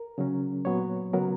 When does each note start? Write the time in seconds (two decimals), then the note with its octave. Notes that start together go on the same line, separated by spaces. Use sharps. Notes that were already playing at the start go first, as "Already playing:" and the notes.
Already playing: A#4
0.18 C#3 F#3 C#4
0.65 A#2 F#3 B3 C#5
1.13 C#3 F#3 B3 A#4